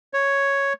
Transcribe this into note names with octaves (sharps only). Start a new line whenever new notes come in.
C#5